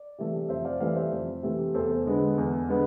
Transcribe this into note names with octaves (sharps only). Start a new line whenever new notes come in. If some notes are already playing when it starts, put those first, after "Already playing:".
Already playing: D5
C3 E3 A3
F2 C5 E5
D5 F5
C3 E3 A3 D5 F5
C5 E5
F2
C3 E3 A3
E2 A4 C5
D3 G#3 B3
E2
D3 G#3 B3